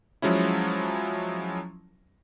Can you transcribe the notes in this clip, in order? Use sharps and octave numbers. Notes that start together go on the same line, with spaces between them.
F3 F#3 G#3 C#4 E4